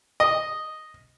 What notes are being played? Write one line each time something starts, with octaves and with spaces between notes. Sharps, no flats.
D#5